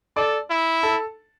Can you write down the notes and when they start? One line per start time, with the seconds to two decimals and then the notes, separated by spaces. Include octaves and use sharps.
0.16 A4 D5 D6
0.50 E4
0.83 A4 A5